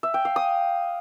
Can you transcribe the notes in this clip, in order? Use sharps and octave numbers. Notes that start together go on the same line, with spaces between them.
E5
G5
F5
D#6